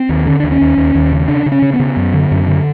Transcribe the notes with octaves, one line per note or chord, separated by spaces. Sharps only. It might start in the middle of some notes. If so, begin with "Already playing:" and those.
Already playing: C4
D#2
D3 C#4
D#2 D4
C#4
D#2
D#2
D#2
C#3
C#3 D4
C#3
C#4
C#3
B3
C#3
F#2
D3
F#2
D3